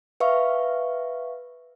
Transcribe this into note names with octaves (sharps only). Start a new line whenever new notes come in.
B4 E5 F5 C#6